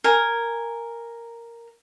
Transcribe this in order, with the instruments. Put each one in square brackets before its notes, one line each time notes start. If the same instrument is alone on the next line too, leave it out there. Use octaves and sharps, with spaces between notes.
[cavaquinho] A#4 G#5